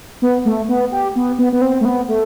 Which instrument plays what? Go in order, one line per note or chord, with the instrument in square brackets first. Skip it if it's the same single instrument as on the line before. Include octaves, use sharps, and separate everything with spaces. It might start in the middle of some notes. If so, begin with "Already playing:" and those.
[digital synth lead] B3
A3
B3
G4
B3
B3
B3
C4
A3
B3
A3